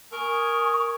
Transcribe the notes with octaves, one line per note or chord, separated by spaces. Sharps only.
A#4 G#5 C#6 D#6